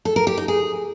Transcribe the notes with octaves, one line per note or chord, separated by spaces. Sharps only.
A4
A#4
G4
D#4
G#4